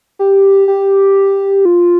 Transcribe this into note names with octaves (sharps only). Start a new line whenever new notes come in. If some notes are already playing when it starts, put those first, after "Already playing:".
G4
G4
F4